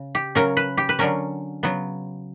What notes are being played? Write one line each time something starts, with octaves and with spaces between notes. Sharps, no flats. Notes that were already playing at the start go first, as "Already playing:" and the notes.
Already playing: C#3
G4
C#3 F#3 C#4 A#4
B4
G4
B4
D3 F#3 C#4 A#4
C#3 F#3 B3